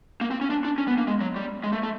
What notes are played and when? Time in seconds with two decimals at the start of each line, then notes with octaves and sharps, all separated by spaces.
0.21 A#3
0.31 C4
0.41 C#4
0.50 D4
0.65 D4
0.78 C#4
0.88 B3
0.98 A#3
1.07 G#3
1.21 F#3
1.36 G3
1.64 G#3
1.73 A3
1.83 A3